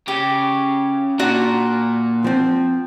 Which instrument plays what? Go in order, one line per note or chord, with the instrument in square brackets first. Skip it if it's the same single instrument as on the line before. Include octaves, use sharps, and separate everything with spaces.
[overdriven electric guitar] C#3 [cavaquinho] G4
[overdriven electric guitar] A#2 [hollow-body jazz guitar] D4 [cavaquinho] F#4
[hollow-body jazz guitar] F3 C4